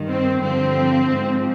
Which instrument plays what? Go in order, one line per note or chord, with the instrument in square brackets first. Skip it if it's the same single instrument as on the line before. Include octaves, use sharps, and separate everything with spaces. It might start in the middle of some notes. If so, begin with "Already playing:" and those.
Already playing: [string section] G2 D#3
C4
G2 D3 F3 C4
G#2 F3